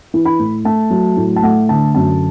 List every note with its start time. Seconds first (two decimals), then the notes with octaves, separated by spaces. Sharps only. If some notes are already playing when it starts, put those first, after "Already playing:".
0.14 E3
0.25 B5
0.39 A2
0.65 A3 A5
0.90 F#3
1.17 A2
1.36 A5
1.43 A3 F#5
1.69 D3 A5
1.94 F#2 A5